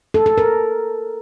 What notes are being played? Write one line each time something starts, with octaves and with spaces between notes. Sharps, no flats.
A4
A4
A#4